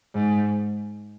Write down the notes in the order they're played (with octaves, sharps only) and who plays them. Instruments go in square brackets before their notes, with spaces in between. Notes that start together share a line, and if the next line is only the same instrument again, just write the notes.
[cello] G#2